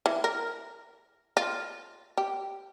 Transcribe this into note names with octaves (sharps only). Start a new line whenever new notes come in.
E3
A#4
F4
G4